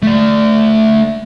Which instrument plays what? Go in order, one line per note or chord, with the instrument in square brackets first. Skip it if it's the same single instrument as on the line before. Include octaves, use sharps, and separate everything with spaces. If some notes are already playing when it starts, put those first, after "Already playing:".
[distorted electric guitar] A3 D5